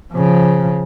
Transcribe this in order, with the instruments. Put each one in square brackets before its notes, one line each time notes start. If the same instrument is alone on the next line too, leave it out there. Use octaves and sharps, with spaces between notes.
[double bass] C#3 F3